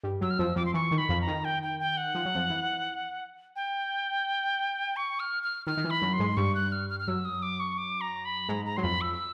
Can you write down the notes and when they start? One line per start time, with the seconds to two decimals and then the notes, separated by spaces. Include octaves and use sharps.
0.03 G2 G3
0.21 F#2 F#3 E6
0.30 F6
0.39 F2 F3 E6
0.56 F2 F3 D6
0.65 C6
0.74 E3 C#6
0.91 D#3
0.98 B5
1.09 F2 F3
1.21 A#5
1.27 D#3
1.44 G5
1.63 G5
1.80 G5
1.97 F#5
2.15 F3
2.25 F#3
2.35 F2 F3
2.50 E3
3.56 G5
4.96 C#6
5.20 F6
5.43 F6
5.66 D#3 F6
5.77 D#3
5.84 E3
5.90 B5
6.02 F#2 F#3
6.13 C6
6.19 G#2 G#3
6.37 G2 G3 C#6
6.55 F#6
6.72 F6
6.90 F6
7.00 F6
7.07 F#2 F#3 E6
7.25 D#6
7.42 D6
7.60 C#6
7.78 D6
8.01 A#5
8.25 B5
8.49 G#2 G#3 A#5
8.65 A#5
8.77 F#3 C6
8.83 F2 F3 B5
9.01 E6